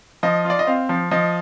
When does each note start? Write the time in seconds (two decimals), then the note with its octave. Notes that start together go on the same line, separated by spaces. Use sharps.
0.23 F3 D#5
0.45 F4 D5
0.59 D#5
0.67 C4 F5
0.89 F3
1.11 F3 D#5